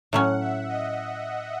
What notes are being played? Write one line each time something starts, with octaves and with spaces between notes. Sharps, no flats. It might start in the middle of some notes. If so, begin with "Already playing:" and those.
A2 F#3 C#4 F#5
E5
D#5